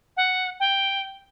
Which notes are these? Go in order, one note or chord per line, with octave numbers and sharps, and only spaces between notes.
F#5
G5